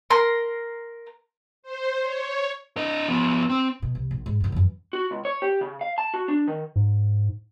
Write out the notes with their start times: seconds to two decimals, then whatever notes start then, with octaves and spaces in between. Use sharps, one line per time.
0.11 A#4 C6
1.63 C5
2.00 C#5
2.77 D4 D#5
3.08 F3 B3
3.49 C4
3.82 B2
3.95 C2
4.11 A#1
4.26 G#2
4.40 C#2 G2
4.52 F#2 E3
4.93 F#4
5.11 C#2
5.25 C#5
5.42 G4
5.61 C#3
5.81 F5
5.98 A5
6.14 F#4
6.28 D4
6.48 D#3
6.76 G#2